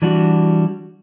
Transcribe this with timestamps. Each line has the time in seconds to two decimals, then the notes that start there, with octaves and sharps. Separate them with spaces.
0.02 E3 G3 D4 F#4